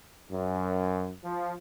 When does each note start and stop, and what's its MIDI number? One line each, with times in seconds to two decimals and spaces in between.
0.31 1.10 42
1.24 1.53 53